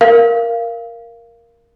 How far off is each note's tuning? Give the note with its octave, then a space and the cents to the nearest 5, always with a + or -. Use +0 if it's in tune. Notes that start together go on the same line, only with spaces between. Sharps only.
A#4 +0 F5 -15